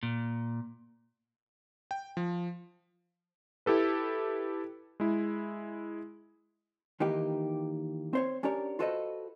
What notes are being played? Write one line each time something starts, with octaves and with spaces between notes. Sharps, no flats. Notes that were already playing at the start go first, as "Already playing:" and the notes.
A#2
G5
F3
E4 G4 A4 B4
G#3 E4
D#3 E3 A#3 D#4 G4
C4 C5 C#5
C#4 D4 G4 A#4 C#5 D5
F4 F#4 A4 B4 C5 D#5